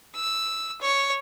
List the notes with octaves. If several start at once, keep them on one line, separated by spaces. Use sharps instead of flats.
E6
C#5